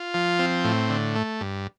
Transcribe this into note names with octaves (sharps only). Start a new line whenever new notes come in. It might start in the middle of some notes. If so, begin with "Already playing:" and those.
Already playing: F4
F3
C4
A2
D3
A3
G2